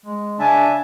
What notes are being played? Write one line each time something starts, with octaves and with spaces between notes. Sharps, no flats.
G#3
C#3 D4 E5 G#5 A5